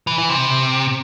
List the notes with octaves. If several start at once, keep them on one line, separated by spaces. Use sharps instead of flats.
E3
E3
C3